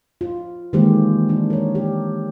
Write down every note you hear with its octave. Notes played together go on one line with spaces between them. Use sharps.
F4
D#3 E3 G#3 A#3 G4 C5
D4 E4
A#4 C#5
G4